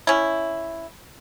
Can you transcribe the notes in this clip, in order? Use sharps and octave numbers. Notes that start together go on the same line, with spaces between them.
C#4 E4